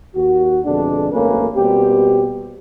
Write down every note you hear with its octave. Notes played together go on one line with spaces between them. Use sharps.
D#2 F#4
F2 B2 D3 G#3 D4
G#1 F#2 A3 A#3 C#4 B4
B2 G3 A#3 C4 G4